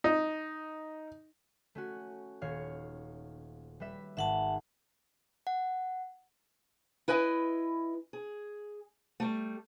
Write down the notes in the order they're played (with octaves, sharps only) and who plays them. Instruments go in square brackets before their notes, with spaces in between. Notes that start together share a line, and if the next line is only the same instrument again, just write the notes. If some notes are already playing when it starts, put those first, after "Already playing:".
[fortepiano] D#4
[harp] A3 C#4 F#4
D#1 C#5 F5
G3 B4 E5
[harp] G#1 [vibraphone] E5 F#5 A5
[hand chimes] F#5
[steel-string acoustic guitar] E4 B4 D#5 G#5
G#4
G3 A3